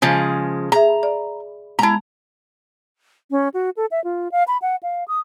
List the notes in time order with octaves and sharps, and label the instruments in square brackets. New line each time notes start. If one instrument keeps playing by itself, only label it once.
[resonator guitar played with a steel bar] C#3 F3 G#3
[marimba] G#4 E5 [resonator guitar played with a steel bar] A#5
[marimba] D5
[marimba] G#3 A5 [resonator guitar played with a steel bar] E4 A#5
[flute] C#4
F#4
A4
E5
F4
F5
B5
F#5
F5
D#6